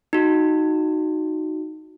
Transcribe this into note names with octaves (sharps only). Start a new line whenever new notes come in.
D#4 F#4